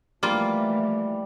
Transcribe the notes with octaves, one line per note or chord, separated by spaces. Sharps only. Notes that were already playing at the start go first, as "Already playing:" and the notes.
E3 F3 G3 A3 A#3 F4